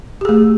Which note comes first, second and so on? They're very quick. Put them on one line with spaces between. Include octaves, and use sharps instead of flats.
G4 G#4 A3